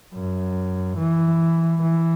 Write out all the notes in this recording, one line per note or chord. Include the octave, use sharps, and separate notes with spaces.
F#2
E3
E3